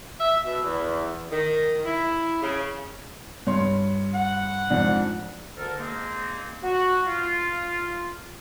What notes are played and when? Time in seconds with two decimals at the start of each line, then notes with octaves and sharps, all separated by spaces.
0.20 E5
0.45 B2
0.63 E2
1.31 D#3
1.85 E4
2.42 C#3
3.47 G2 C#5 C6
4.15 F#5
4.70 F2 G#2 D4
5.57 D2 D3 A4 A#4
5.79 G#3 A#3 C4 D#4
6.63 F#4
7.07 F4